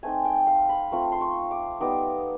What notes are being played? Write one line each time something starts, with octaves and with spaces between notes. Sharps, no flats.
A3 C4 D#4 G#5
G5
F5
B5
A3 C4 F4
C6
C#6
D6
G3 B3 D#4 D6